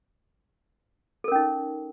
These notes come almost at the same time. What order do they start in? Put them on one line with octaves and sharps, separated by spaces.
A4 A#4 C#4 D#4